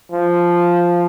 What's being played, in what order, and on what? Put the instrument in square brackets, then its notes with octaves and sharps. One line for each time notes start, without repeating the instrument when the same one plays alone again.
[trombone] F3